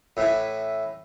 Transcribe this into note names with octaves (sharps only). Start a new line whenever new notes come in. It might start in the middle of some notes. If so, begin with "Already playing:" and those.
A2 E3 E4